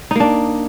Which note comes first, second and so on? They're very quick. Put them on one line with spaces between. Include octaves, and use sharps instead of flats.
D#4 A#3 D4